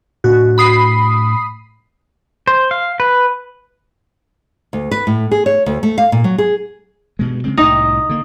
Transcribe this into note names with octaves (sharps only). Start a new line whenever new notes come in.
A2 D4 F#4
B5 D#6 C7
C5
F5
B4
D2
B4
A2
G#4
C#5
D2
A3
F5
A#2
F#3
G#4
G2 B2 G#3
C#3 G#3 C4
C2 A2 D#4
D3 A#3